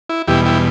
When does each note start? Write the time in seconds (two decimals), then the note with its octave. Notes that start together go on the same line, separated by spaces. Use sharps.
0.09 E4
0.27 E2 B2 G3 E4 G4
0.45 E4 G4